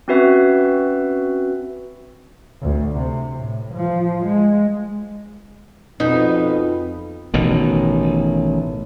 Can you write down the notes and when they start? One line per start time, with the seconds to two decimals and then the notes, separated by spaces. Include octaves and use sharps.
0.08 C4 C#4 F#4 B4 E5
2.62 D2
2.98 C3
3.35 A2
3.74 F3
4.25 G#3
6.00 F2 B2 D#4 B4
7.34 A1 B2 D#3